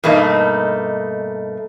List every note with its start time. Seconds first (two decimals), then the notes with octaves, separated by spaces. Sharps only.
0.04 G2 B2 A3 A#3 D#4